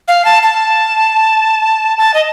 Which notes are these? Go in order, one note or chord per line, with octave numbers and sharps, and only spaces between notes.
F5
A5
A5
A5
D#5